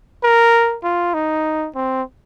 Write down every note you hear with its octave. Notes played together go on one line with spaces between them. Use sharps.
A#4
F4
D#4
C4